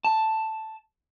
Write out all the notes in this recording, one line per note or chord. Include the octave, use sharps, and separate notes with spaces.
A5